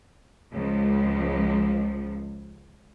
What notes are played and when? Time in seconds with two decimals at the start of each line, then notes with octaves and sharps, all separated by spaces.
0.53 C#2 F3